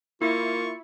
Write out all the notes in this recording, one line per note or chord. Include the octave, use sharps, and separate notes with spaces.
A#3 E4 F4 C#6